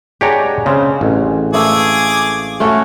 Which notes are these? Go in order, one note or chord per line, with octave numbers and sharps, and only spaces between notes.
G#3 D4 G4 C#5 F#5 A#5
C#3 C4 C5 F5
A1
A3 G#4 D5 F5 D6 E6
A3 C#4 F#4